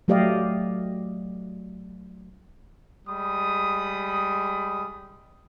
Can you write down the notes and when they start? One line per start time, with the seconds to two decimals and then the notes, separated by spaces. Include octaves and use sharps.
0.08 F#3 A3 G4 D5 D#5 F5
3.08 G3 G#3 B5 D#6